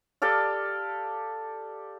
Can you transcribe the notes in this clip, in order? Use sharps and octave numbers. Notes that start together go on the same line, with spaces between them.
G4 A4 D5 F5